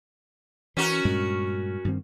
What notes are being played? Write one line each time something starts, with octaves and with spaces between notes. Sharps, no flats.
E3 C#4 F#4 A#4
G2 A#2 G#3
G2 D#3 C4